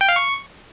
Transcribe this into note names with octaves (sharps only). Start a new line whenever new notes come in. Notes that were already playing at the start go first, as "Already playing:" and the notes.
G5
F5
C#6